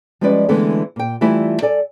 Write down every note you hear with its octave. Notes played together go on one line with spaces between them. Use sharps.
F3 G3 G#3 C#4 B4 D5
D3 E3 G#3 A3 B3 C4
A#2 G5
E3 G3 A3 E4 F4 G#5
A4 D5 G#5